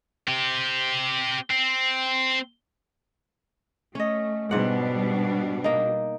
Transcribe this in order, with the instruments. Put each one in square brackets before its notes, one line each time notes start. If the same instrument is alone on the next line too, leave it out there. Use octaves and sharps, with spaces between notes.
[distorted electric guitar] C4 G4
C4
[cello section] A3 [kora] C#4 D#5
[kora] G#2 F#5 [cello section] B2 G3 D4
[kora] A#3 D#4